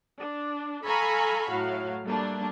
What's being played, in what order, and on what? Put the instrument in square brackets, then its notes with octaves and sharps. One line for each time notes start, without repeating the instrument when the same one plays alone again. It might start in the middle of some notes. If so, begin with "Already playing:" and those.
[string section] D4
A4 F5 G#5 A#5 B5 C#6
A2 F#3 F#4 F5
G3 A3 A#3 D4